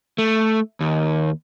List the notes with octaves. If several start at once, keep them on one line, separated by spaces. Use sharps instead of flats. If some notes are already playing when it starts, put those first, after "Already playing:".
A3
D#2